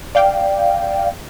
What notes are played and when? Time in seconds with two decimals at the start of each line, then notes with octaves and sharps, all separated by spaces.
0.15 D5 F5 G5